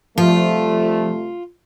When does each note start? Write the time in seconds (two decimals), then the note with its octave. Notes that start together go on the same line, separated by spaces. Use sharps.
0.18 C3 F3 G3 A3 F4